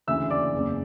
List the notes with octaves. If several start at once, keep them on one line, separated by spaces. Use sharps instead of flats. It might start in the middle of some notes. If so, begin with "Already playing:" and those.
D2 C#3 E3 E5 E6
D5 D6
F#1 E2 C#3